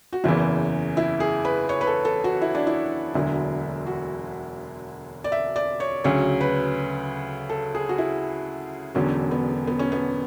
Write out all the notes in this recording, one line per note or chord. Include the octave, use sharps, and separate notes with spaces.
F#4
F#1 E2 C#3 E3 E4
E4
G#4
B4
C#5
B4
A4
A4
F#4
E4
D4
E4
E1 D2 D3 F#3 E4
F#4
D5
E5
D5
C#5
D2 C#3 F#3 C#5
B4
A4
G#4
F#4
E4
E1 E2 D3 F#3 C#4
B3
B3
C#4
B3